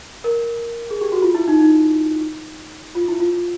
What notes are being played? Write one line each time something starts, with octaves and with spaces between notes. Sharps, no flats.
A#4
G#4
G4
F#4
F4
E4
D#4
D#4
F4
E4
F4